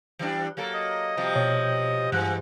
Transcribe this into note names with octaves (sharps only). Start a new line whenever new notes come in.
E3 G3 D4
F#3 A#3 A4
D#5
C3 F3 G3
B2 C#5
G2 E3 G#3 F#5 F#6